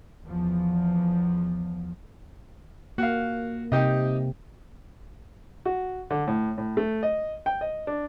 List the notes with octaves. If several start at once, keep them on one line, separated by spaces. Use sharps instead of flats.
E2 F3
A#3 F#4 F5
C3 D#4 G4 D#5
F#4
D3
A2
A2
A3
D#5
G5
D#5
D4